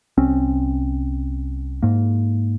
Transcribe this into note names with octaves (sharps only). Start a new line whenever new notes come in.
C2 C4 C#4
G#2 A#3